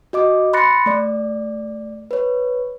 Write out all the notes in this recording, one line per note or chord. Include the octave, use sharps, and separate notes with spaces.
F#4 D#5 D6
B5 C6 F#6 A6 A#6 C#7
A3 D5
B4 C#5